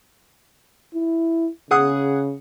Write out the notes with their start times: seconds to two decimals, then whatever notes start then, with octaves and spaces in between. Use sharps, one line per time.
0.95 E4
1.71 C#3 G#4 F#5 D#6